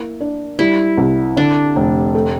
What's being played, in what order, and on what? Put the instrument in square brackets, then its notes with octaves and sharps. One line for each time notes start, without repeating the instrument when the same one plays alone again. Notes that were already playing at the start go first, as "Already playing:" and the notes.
Already playing: [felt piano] A#3 [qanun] E4
[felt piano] D4
[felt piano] G3 [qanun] E4
[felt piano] C2
[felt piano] D3 [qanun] D4
[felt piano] F1
A3